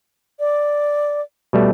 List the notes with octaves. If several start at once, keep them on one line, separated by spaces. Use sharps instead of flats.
D5
B2 G3 A3